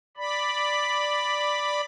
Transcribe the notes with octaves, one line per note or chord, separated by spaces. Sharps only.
D5 B5